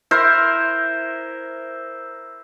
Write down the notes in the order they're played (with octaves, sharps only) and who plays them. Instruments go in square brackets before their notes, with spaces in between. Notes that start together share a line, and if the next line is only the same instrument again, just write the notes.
[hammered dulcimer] E4 A#4 C5